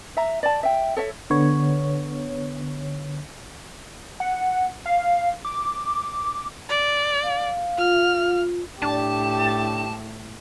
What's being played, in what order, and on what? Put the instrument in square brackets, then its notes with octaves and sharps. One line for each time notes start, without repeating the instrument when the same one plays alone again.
[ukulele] E5 A#5
D5 A5
E5 G5
A4 C#5 E5
[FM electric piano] D3 B3 C#5
[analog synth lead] F#5
F5
D6
[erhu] D5
[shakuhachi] F5
[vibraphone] F4 [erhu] F6
[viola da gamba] A2 [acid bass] D4 [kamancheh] G4 [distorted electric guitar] A5